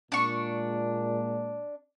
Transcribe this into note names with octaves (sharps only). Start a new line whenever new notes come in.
A#2 G#3 D4 C#6